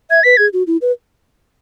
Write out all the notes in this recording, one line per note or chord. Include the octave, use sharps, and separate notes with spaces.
E5 G#6
B4 B6
G#4 G#6
F#4
E4
B4